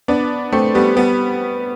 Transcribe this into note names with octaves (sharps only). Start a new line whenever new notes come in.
B3 D4
A3 C4
G3 B3
G3 B3